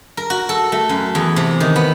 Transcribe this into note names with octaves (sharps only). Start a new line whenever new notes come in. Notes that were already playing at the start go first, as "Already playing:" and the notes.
A#4
F#4
A4
A3
F#2
E2
C3
D#3
B3